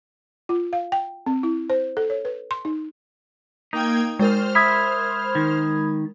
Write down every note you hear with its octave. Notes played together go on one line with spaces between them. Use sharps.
F4
F5
G5
C4
E4
C5
A4
C#5
B4
C6
D#4
A#3 D#4 G5 G#6
G#3 A#4 C5 F6
E5 B5 D#6 G#6
D#3